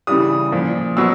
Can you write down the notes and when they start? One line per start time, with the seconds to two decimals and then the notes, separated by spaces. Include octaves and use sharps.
0.07 C#3 E3 G3 D#6
0.52 A#2 F3
0.97 B2 F#3 E6